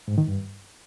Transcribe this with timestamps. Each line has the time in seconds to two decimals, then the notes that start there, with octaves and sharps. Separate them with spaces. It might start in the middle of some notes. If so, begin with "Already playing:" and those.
0.08 G#2
0.18 D#3
0.28 G2